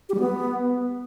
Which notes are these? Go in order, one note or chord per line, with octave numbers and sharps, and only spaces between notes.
G4
G3
B3